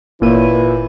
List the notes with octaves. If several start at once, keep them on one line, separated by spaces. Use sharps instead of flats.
G1 A#2 E3 A#3 E4 C#5 D#7